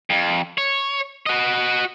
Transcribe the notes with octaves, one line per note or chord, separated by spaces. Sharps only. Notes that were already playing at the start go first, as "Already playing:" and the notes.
F2
C#5
F#4 D#5